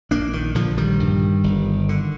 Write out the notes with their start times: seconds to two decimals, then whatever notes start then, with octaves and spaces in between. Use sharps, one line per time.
0.11 A#1 A#3 D4
0.33 D#3
0.55 A#1 D3 F3
0.77 D#3 G3
1.00 G2
1.44 G1
1.89 D3